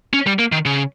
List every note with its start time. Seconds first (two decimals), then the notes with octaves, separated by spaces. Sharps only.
0.13 C#4
0.27 G3
0.39 A#3
0.52 D#3
0.66 C#3